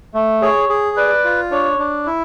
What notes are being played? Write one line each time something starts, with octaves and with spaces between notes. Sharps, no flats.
A3
G#4 C#5
G#4
B4 D5
F4
D4 C#5
D4
E4